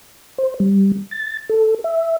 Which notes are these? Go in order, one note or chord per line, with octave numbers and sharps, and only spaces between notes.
C5
G3
A6
A4
E5